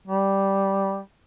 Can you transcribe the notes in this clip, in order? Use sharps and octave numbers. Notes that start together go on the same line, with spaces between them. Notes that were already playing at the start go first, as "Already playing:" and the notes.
G3